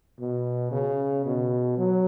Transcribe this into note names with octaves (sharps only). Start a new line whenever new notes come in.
B2
C#3
B2
F#3